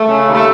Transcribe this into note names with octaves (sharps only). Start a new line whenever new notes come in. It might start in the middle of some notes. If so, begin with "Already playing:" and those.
Already playing: A3
C#3
D#2
A3